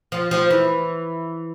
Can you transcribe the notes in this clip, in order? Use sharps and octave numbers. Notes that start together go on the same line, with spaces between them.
F3
F3
E3